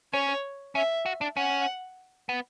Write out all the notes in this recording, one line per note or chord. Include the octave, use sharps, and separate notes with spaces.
C#4 C#5
C#4 E5
F#4
D4
C#4 F#5
B3